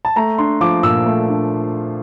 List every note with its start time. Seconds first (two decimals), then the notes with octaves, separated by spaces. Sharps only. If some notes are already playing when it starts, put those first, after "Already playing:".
0.05 A5
0.16 A3 A#5
0.38 D4 C6
0.61 F3 D6
0.83 A#2 E6
1.06 A3
1.29 D4